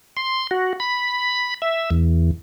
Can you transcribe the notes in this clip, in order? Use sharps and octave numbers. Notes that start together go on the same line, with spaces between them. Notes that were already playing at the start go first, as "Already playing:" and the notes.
C6
F#4
B5
E5
E2